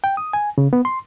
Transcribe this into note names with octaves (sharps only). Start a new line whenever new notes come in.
G5
D#6
G#5
C#3
B3
C6